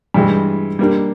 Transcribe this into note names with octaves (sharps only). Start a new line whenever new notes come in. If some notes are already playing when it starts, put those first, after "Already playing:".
G2 E3 G#3
G3 A#3 D4